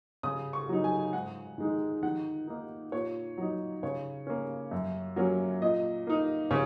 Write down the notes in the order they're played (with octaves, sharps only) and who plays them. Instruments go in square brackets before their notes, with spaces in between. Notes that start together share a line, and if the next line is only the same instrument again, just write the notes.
[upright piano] C#3 D#6
C#6
F#3 D#4
G#5
G#2 F#5
D#3 G#3 D#4
D#3 F#5
A#3 D#4
A#2 C#5
F#3 D#4
C#3 C#5
A#3 C#4
F#2
F#3 A#3 C#4
A#2 D#5
A#3 D#4
C#3 C#5